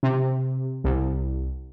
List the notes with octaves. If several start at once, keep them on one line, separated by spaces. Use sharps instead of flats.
C3
C2